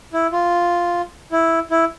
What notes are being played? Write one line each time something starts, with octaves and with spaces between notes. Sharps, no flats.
E4
F4
E4
E4